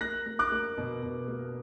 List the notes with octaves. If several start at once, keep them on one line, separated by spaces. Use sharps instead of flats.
A#3 F#6 A#6
A#3
D6 F#6
A#3
B2
B2
A#3